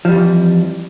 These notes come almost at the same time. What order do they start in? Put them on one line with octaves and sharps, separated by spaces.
F3 G3 F2 E3